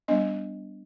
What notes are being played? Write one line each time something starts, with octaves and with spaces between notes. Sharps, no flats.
G3 B3 D4 D#5